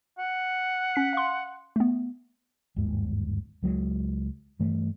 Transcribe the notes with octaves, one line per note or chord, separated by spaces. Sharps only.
F#5
C#4 B6
F5 C6
A3 B3
G1 D#2 G#2 G#3
C#2 F#3 G#3
G2 E3 A3